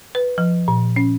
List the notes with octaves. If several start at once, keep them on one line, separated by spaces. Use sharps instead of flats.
B4
F3
A#2
C#4